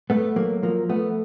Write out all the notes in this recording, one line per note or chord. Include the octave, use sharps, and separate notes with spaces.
A3 B3
F#3 A#3
F3 A#3
A3 B3